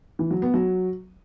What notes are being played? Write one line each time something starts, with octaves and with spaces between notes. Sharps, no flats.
E3
F#3
B3
F#3